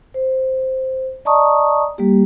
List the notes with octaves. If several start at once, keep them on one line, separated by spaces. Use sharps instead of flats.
C5
D5 D#5 A5 A#5 C#6 D#6
G3 A#3 G4